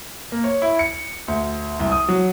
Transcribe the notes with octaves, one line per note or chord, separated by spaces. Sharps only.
A#3
C#5
E4
C#7
D2
C2
D#6
F#3